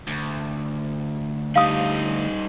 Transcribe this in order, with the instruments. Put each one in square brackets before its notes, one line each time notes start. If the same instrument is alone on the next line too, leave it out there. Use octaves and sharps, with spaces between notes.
[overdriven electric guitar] D2
[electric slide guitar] G3 D#4 G4 [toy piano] F5 D#6